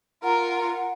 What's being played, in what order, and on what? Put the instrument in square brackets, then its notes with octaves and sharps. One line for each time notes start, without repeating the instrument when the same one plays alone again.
[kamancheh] F4 A#4 [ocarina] F#5